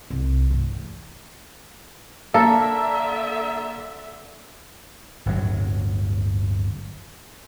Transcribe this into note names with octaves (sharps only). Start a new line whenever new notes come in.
C2
D2 G2
E2
D3 A#3 A4 E5
D1 G1 F#3